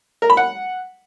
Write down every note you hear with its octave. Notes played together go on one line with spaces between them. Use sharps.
A#4
B5
F#5